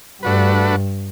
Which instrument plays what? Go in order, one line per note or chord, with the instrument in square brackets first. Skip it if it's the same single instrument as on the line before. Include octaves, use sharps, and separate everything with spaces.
[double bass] G2 [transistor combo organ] A3 D4 F#4 B4